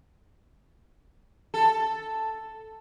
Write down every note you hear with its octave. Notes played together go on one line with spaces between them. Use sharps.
A4